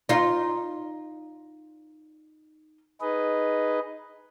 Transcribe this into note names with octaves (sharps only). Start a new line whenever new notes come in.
D#4 F4
D#4 G#4 B4 D#5